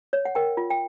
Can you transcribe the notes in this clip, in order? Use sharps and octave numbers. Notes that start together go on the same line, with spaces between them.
C#5
F#5
A#4 G5
F4
G5